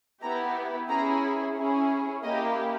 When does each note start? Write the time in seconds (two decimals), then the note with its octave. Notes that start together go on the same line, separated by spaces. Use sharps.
0.22 B3 E4 G4 A#5
0.89 C#4 E4 G#4 A#5
1.56 C#4 E4 G#4
2.23 A#3 E4 G4 D#5